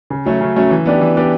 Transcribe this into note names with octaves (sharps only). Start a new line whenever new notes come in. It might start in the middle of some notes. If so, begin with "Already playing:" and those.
C#3
F#3 A3 C#4
C#3
F#3 A3 C#4
E3
B3 D4 G4 D5
E3
B3 D4 G4 D5